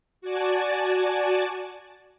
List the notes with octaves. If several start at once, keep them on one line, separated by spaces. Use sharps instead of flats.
F#4 D5 G#5 A5